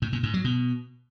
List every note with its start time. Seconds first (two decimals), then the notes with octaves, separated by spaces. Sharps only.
0.02 A2
0.13 A#2
0.23 G#2
0.34 F#3
0.44 B2